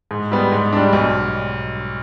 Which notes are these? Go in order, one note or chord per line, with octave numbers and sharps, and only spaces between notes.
G#2
G3 B3
G#2
G3 D4
B1